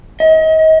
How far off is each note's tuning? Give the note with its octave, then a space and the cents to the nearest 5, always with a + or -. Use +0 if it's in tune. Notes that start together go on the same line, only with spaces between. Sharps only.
D#5 +35